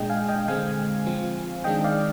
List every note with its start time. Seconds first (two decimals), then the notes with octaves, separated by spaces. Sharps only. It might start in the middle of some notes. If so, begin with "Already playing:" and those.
Already playing: A#2 G#3 D4 D#5 G5
0.09 F5 G#5
0.29 D#5 G5
0.48 D3 G#3 C4 F5 G#5
1.06 F3 C4
1.64 D#3 G#3 D4 D#5 G5
1.84 D5 F5